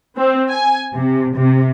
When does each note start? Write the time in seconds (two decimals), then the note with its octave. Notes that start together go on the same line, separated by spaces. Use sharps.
0.17 C4
0.50 G#5
0.94 C3
1.36 C3